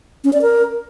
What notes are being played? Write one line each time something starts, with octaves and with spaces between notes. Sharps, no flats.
C#4
D5
A#4